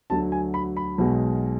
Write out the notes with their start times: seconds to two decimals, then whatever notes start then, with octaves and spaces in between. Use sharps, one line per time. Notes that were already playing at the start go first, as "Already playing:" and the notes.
0.10 D2 D3 F#3 A5
0.32 G#5
0.54 B5
0.77 B5
0.98 B1 B2 G#3